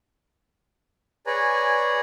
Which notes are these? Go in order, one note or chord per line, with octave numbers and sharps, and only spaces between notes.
G#4 B4 C#5 D5 G#5 A#5